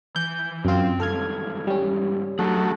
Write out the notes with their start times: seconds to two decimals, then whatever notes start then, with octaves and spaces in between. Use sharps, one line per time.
0.16 E3 G6
0.65 F#2 C4 F4 G5
1.00 C#2 G2 A4 F6 G#6
1.67 G3 C#4
2.39 F#3 A3 D4 G#4